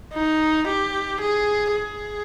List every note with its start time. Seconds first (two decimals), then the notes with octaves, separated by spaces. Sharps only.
0.13 D#4
0.67 G4
1.21 G#4
1.75 G#4